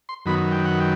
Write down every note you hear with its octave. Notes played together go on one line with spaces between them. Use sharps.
C6
F#2 D#3 F#3 B3 B5
G5
F#5
G5